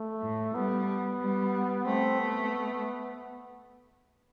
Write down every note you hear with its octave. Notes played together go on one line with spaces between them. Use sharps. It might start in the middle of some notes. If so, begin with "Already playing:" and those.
Already playing: A3
A2
G3 B3
G3
A3 C4
B3